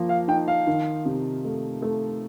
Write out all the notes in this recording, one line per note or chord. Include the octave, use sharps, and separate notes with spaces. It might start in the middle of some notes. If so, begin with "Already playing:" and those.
Already playing: F3 A#3
F5
D#4 G5
F5
D#3
C3
A3
A3